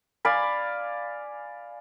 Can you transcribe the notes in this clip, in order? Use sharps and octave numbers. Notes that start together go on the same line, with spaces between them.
D5 F5 G#5 B5